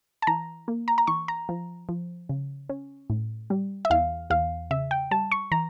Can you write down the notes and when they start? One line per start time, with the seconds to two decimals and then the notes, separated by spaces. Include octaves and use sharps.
0.22 A5
0.27 E3 A#5
0.68 A#3
0.88 A#5
0.98 A#5
1.07 E3 C#6
1.28 A#5
1.49 F3
1.89 F3
2.29 C#3
2.69 C#4
3.10 A2
3.50 G3
3.85 E5
3.90 E2 F5
4.30 E2 F5
4.71 C#3 E5
4.91 G5
5.11 G3 A5
5.32 C#6
5.51 E3 A#5